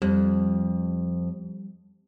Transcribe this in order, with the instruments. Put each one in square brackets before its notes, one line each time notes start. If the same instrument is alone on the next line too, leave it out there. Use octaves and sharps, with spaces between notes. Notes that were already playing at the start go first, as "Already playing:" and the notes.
[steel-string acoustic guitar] F2 [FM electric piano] G3